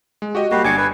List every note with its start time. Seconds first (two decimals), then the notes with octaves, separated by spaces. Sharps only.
0.22 G#3
0.35 F#4 G4 D#5
0.51 G3 A#3 F#4 G4 C7
0.64 G1 D4 G#5 D6 C#7
0.78 B4 G#5